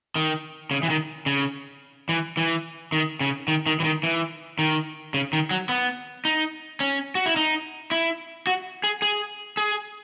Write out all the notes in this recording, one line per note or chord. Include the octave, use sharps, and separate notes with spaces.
D#3
C#3
E3
D#3
C#3
E3
E3
D#3
C#3
D#3
D#3
E3
D#3
E3
D#3
C#3
D#3
F#3
B3
D#4
C#4
F#4
E4
D#4
E4
F#4
G#4
G#4
G#4